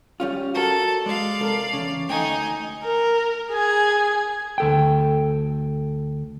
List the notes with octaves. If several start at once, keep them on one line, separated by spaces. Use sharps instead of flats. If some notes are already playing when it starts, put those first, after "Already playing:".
G3 C#4 F4
F#4 A4 A#4
G#3 D5 F5
C2 A4 A#4
E2 C#3
D2 A3 D#4 G5 G#5
A#4
G#4 G#5
D2 A4 G5